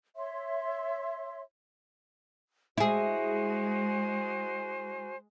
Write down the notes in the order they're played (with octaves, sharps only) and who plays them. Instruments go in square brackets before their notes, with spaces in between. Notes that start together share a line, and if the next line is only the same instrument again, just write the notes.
[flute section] C#5 E5 C6
[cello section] G#3 [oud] E4 G#4 [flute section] F#4 C5 G#5